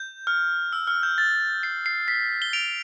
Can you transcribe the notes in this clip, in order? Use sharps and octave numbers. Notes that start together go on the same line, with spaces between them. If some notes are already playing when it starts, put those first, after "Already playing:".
Already playing: G6
F6
E6
F6
G6
A6
C7
C7
B6
G7
D7 F7